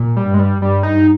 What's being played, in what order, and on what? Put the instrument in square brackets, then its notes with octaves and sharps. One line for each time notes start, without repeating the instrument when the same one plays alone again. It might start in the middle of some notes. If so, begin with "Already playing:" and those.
Already playing: [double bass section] A#2
[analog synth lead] G3
[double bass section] G2
[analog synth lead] G#3
G3
[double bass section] G2 [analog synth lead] G3
[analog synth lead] D#4